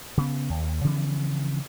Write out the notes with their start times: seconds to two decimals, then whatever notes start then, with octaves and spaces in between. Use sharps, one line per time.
0.17 C#3 B3
0.50 D#2
0.84 C#3 E3 F3 C4